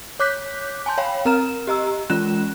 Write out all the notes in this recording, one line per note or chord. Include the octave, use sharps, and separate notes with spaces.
C#5 D6 F#6 G6 B6
G#5 A5 C6 G6
C#5 F5 G5 B5
C4 A#4 A#5 F6 E7
G4 D#5 A#5 E6
E3 G#3 C#4 F4 F#6 E7